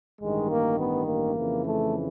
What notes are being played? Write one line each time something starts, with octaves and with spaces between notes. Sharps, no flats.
A1 G2 D#3 G#3
A#3
B3
A#3
F2 C#3 E3
A3